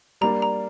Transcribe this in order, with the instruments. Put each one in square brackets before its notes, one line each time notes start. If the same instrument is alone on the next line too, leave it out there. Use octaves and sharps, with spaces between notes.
[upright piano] G3 A#3 D4 [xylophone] A#5
[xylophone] A#5